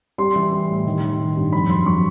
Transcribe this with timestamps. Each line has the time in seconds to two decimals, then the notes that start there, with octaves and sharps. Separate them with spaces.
0.18 G3 C6
0.36 E3
0.52 G3
0.69 A2
0.86 D#3
1.02 D#3
1.19 D#3
1.36 G2
1.53 F2 B5
1.69 F#3 C6
1.86 F#3 C#6